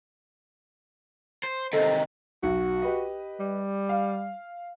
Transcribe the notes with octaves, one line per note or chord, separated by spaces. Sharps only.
C5
C3 D#3 A4 C5 D#5
B1 F#4
G4 B4 D#5
G3
F5